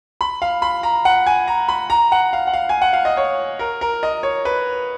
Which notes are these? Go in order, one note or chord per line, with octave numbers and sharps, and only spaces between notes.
B5
F5
B5
A#5
F#5
G#5
A#5
B5
A#5
F#5
F5
F#5
F5
G#5
F#5
F5
D#5
C#5
A#4
A#4
D#5
C#5
B4